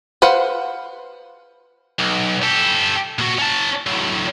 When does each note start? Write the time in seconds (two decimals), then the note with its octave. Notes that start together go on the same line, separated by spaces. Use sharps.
0.22 B4 C5 F5 F#5
1.99 B1
2.43 G4 A4
3.19 A#2 F#4
3.38 C#4 A5
3.87 A2 F#3